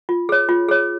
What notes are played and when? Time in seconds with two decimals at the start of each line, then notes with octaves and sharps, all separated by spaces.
0.09 F4
0.29 G#4 C#5
0.49 F4
0.69 G#4 C#5